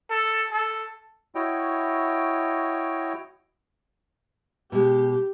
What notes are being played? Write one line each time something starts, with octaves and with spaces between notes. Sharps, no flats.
A4
A4
E4 F#4 C#5 D#5 G5
B2 G#3 G4